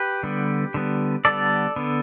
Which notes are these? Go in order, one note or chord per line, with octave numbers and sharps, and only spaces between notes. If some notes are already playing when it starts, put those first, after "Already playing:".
Already playing: G4 B4
D3 G3 B3
D3 G3 B3
D3 G3 B3 A4 D5
D3 B3